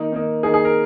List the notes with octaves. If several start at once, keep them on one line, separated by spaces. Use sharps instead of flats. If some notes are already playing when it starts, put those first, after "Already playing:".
Already playing: D#3 A#3 D#4
D#3 A#3 D#4
D#3 A#3 D#4 G#4
G#4
A#4